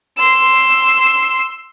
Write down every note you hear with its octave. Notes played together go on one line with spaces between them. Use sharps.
C6 E6